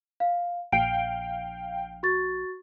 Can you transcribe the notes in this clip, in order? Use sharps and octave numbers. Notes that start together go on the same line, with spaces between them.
F5
A#1 F5 G5 D7
F#4 C#6 A6